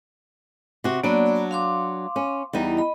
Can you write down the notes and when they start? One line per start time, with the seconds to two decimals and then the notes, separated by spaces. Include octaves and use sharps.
0.84 C3 F#4
1.04 F#3 A#3 B3 D4 D5
1.51 F5 C6 D6
2.16 C#4
2.53 E2 G3 D#4
2.77 D#5 B5